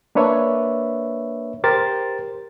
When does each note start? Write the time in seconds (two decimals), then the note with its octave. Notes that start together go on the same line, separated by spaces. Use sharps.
0.15 A#3 D4 B4 C#5 E5
1.64 G4 A#4 C5 A6